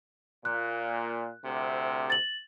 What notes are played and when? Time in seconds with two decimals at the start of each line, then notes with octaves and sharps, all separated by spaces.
0.45 A#2 F#6
1.45 D2 C3
2.10 A6 F#7